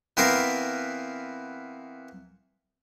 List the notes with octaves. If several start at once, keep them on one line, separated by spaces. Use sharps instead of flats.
E3 B3 C4 A#4 F5 A#5